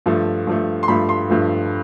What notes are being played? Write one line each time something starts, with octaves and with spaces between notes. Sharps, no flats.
G2 F3 A3
G2 F3 A3
C6
G2 F3 A3 B5
C6
G2 F3 A3